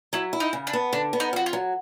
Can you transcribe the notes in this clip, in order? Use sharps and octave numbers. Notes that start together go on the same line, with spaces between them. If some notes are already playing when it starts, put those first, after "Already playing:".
F#3 E4
E4
D#4
C#3
D4
B3
D3 D4
B3
D#4
F2 F#4
F4
F#3